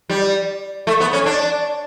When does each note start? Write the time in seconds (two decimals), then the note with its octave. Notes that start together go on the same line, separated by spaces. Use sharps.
0.09 G3
0.87 A3
1.00 B3
1.13 C#4
1.26 D4